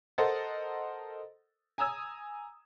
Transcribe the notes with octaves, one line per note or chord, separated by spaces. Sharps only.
A4 A#4 C5 D#5 F#5 A6
G#5 A#5 D#6 E6 G#6